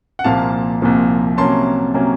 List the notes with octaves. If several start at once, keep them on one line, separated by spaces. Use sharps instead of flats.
F#5
C2 A#2 F3 A#3 F5 A5
C2 A#2 F3 A#3
C3 F#3 A#3 C#4 A5 C6
C3 F#3 A#3 C#4